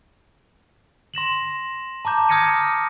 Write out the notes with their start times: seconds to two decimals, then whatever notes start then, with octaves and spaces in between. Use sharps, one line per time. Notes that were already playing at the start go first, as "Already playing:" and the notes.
1.14 C6 A#6 E7 F#7
2.05 A5 A#5 D6 G6
2.29 D#6 F6 G#6 A#6 C#7 D#7